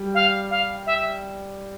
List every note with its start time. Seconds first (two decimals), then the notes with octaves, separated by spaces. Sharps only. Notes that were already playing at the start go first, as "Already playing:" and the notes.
Already playing: G3
0.15 F5
0.50 F5
0.86 E5